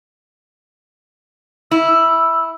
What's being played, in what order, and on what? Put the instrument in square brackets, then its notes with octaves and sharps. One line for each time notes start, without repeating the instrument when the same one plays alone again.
[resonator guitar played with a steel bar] E4 [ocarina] E6